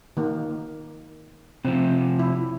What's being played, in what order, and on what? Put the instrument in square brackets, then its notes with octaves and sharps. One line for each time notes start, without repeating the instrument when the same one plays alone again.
[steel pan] D#3 A#3
[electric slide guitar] C3 F3 [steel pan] C4
[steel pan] E4